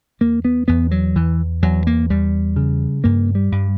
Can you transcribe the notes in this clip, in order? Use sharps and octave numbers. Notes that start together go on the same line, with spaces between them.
E2 A#3
B3
E2 B3
F#3
E2 E3
E2 F#3
A#3
E2 G3
C#3
G2 A#3
G3
G2